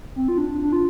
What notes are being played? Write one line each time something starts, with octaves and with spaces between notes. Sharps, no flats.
C4
F4
D4
D4
F4